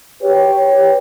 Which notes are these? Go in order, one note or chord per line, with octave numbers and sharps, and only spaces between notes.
G4 B4 C#5